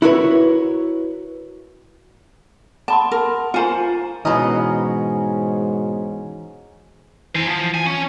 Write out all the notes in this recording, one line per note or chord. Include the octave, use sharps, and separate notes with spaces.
E4 F#4 A#4 B4 C#5
F#5 A5 B5 C6
A#4
F4 C5 F5 G#5 A#5
G#2 B2 E3 C#4 D#5 A#5
E3 C5 G#5
F3
G#5
C#4